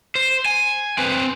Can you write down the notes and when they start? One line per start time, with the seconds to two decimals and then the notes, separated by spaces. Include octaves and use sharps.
0.15 C5
0.46 G#5
0.98 C4 B4